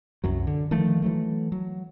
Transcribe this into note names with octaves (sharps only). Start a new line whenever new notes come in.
C2 F#2 F#3
D3
D#3 F3 A3
E3 F#3 A3
F#3